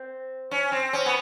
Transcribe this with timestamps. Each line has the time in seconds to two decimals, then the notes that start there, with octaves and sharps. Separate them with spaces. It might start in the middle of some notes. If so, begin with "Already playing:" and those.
Already playing: C4
0.51 C#4
0.72 C4
0.93 C#4
1.06 B3